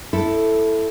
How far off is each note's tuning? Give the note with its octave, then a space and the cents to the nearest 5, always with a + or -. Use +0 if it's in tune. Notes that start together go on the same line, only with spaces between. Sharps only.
E4 +0 A4 +0